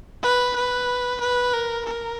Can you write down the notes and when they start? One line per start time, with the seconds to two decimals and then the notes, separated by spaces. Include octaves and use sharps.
0.23 B4
0.55 B4
1.20 B4
1.53 A#4
1.86 A#4